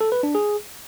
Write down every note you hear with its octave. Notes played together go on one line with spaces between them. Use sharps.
A4
B4
D4
G#4